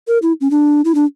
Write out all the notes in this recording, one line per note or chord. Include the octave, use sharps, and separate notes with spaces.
A#4
E4
C#4
D4
E4
D4